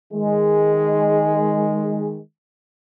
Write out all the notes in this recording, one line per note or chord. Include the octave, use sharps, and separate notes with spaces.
D#3 G#3